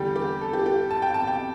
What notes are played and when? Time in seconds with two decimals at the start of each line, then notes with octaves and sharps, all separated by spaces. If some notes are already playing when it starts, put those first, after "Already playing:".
Already playing: E2 D3 G3 G4
0.16 G4
0.41 A4
0.53 G4
0.66 G4
0.91 A5
1.02 G5
1.14 A5
1.27 G5